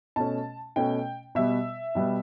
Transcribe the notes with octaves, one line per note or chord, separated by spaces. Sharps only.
B2 A3 C#4 A5
B2 A3 C#4 G5
B2 G3 B3 E5
B2 G3 B3